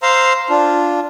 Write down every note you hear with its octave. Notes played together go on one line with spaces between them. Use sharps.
C5 F5 A#5 C6 E6
D4 F4